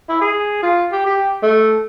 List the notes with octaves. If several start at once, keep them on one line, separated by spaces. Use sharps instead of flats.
E4
G#4
F4
G4
G4
A3